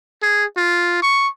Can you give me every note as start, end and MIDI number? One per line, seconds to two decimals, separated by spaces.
0.22 0.45 68
0.57 0.99 65
1.02 1.28 85